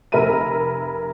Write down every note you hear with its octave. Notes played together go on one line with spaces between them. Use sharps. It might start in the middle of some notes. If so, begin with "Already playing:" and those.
F1 A#4 E5 B5 D#7